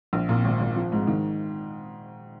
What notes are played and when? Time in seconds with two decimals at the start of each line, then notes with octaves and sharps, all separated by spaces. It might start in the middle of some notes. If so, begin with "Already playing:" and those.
0.13 A#1
0.29 A#2
0.45 G#1
0.60 G#1
0.76 F3
0.92 G#2
1.07 D#3